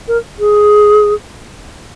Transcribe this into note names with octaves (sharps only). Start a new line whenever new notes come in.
A#4
G#4